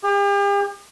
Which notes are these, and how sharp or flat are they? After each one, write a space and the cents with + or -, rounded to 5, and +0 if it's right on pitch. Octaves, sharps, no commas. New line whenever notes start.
G4 +45